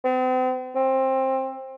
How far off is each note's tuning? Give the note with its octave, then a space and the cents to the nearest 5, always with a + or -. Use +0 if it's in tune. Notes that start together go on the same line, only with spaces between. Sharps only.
C4 -40
C4 +20